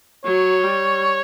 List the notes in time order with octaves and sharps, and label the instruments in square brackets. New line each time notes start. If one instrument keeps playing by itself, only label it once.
[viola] F#3 [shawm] C#5
[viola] G3